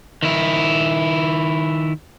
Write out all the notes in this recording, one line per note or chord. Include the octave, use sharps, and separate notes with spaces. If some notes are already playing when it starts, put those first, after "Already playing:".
D#3 E4